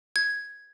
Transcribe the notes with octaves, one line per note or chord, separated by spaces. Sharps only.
G#6